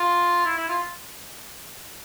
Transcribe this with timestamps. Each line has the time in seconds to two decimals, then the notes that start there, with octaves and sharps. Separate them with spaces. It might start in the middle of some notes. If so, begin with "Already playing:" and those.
Already playing: F4
0.46 E4
0.57 E4
0.69 F4